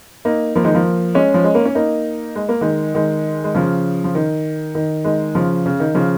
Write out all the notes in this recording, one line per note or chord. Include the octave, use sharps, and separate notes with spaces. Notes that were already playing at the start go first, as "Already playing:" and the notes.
A#3 D#4
F3 A#3
D#3 G#3
F3 A#3
G#3 C#4
F3
G#3
A#3
C#4
A#3 D#4
G#3
A#3
D#3 G#3
D#3 G#3
G#3
C#3 F3
F3
D#3
D#3
D#3 G#3
C#3 F3
C#3
D#3
C#3 F3